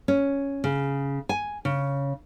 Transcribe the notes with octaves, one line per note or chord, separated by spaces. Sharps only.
C#4
C#3
G#5
C#3